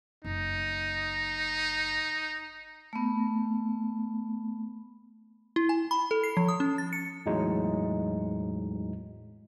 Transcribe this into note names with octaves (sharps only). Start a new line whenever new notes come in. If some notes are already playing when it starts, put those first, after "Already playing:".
F#1 D#4
A3 B3
E4
G#5
B5
A4
C7
F3
D#6
C#4
A6
C#7
E2 A2 F#3 G#3 D#4